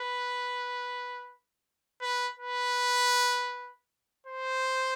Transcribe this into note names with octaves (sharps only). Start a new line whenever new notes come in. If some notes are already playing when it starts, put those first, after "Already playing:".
Already playing: B4
B4
B4
C5